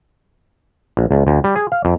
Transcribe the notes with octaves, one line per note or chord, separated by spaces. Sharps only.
A#1
C#2
D2
G3
G#4
F5
F2